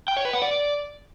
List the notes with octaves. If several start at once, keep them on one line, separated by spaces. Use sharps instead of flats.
G5
C#5
B4
F#5
D5